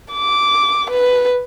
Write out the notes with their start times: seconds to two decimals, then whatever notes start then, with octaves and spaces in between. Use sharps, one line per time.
0.12 D6
0.90 B4